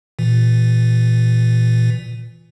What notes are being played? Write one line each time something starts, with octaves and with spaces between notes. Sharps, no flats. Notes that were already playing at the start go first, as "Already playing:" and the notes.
A#2 E3